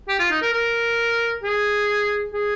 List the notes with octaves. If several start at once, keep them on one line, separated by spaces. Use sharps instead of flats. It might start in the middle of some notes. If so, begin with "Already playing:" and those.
G4
F4
D#4
A#4
A#4
G#4
G#4